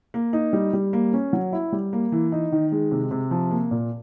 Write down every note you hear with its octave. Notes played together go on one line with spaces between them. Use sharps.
A#3
D#4
G3
G3
A#3
C#4
F#3
E4
G3
A#3
E3
D#4
D#3
G#3
C3
C3
F3
A#3
A#2